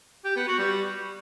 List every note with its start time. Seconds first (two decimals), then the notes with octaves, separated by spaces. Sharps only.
0.25 G4
0.36 B3
0.47 F#4
0.59 G3